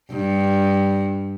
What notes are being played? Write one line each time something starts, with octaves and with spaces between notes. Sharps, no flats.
G2